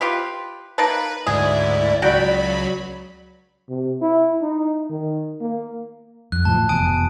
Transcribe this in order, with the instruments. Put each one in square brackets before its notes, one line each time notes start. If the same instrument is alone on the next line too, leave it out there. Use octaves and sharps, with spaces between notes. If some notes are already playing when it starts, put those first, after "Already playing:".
[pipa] F4 G4 B4
[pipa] A#3 D#4 A5 [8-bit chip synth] B4
[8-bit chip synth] D2 G#2 E4 [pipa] G#4 [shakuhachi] D5
[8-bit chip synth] C#2 F#3 B5 [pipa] F#4 G5
[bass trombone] C3
E4
D#4
D#3
A#3
[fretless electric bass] F2 [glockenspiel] F#6
[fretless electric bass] A2 D#3 F3 [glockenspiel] A5
[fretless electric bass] A2
[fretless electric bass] F1 E2 B2 [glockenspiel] G#5 D#6 D7